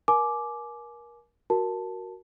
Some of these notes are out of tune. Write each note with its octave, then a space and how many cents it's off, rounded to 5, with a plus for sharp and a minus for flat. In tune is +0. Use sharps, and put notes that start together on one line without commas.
A#4 +30 G#5 +35 D6 +0
F#4 +0 A#4 +0 A5 +0